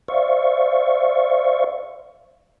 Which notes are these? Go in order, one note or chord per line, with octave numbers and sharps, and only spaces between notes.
C5 D5 E5 F5 C#6